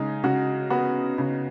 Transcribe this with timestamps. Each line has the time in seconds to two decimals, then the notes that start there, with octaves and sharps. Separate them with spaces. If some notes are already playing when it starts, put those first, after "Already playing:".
Already playing: C#3 G#3 D#4
0.23 C#3 F#4
0.70 B3 F#4
1.18 C#3